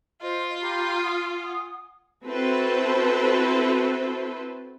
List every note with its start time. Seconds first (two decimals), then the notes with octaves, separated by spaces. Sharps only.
0.22 F4 C5 D#5
0.61 G4 A#5 B5
1.04 F#5 G#5 D#6
2.25 C4 E4 F#4 A4 B4 C5